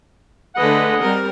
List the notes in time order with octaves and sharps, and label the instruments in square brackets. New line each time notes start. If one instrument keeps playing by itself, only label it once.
[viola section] D3 A3 B4 [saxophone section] G#3 D#5 F#5
[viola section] G3 C4 A#4